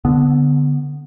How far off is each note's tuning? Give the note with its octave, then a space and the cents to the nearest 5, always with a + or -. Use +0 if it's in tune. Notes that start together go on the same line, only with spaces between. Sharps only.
D3 -10 B3 +0